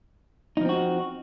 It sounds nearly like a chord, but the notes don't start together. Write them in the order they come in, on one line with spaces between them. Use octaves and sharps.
D#4 F3 C4 F#4